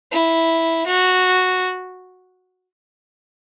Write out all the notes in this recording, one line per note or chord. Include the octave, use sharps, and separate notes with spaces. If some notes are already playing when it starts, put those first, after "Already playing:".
E4
F#4